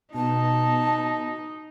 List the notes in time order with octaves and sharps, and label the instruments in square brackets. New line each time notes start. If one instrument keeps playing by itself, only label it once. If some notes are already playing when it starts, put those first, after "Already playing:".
[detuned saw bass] B2 [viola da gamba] D#4 [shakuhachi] A5